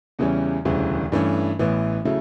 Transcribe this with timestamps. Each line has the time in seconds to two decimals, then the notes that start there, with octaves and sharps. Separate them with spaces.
0.19 E2 C#3 E3 G3 C#4
0.65 E1 D2 C#3 E3 G3
1.12 G2 E3 A3 C#4
1.59 A1 A2 E3 B3
2.05 C#3 F#3 A3 E4